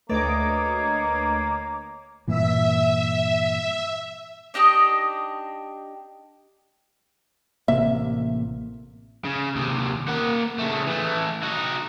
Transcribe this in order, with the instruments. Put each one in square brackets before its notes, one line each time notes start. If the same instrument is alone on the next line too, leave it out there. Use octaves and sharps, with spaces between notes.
[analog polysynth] D2 D#5 D6 [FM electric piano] A3 B4 A6 [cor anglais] A#3 [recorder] C#5
[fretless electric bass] G2 A#2 E3 [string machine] E5
[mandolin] D4 D#4 G4 D#5
[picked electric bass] A1 C3 A#3 [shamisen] E5
[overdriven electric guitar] C#3
D#2 C3
A#3 F#5
C#3 A3
E3 A3
D#4 F#4